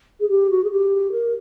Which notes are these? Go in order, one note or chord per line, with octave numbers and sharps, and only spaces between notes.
G#4
G4
F#4
G#4
G4
A#4